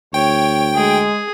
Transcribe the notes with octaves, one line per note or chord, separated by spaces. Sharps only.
D2 C#5 G5
G#3 G#4